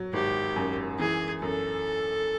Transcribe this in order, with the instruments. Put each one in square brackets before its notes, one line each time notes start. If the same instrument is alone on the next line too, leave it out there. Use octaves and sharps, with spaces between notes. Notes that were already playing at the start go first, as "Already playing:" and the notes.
Already playing: [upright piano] F#3
[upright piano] G#1 [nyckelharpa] G4
[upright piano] F#2
[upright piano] E3 [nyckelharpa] G#4
[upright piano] F#2 [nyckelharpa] A4